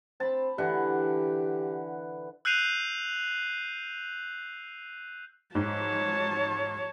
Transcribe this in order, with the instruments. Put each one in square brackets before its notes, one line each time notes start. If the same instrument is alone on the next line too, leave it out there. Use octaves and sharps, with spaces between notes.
[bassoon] C4 [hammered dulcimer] A5 B5
[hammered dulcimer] D3 E3 F#5 [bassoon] G4
[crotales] E6 F#6 G6 C7 D#7 F7
[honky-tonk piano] G#2 [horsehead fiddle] C#5 A5